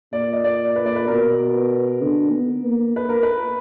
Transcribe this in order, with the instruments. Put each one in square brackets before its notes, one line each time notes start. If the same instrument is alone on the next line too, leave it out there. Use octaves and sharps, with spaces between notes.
[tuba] A#2 [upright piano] D5
[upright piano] D#5
D5
B4
D5
B4
[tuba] B2 [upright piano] A#4
[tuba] D3
B3
A#3
[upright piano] B4
A#4
B4